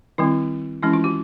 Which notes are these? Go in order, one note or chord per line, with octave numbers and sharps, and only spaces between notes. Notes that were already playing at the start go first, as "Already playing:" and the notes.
D#3 G3 C4 E4
E3 G#3 C#4 E4
F4
F#4